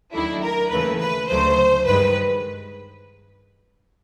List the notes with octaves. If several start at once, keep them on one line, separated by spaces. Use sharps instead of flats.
D#2 D#3 F#3 A3 D4 E4
A#4
D#2 C#3 E3 A3 B4
B4
D2 C#3 F#3 A3 D4 C5
G2 D#3 G#3 B4